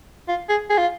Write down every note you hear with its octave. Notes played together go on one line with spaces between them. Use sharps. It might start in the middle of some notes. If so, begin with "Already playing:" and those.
F4
G#4
G#4
F4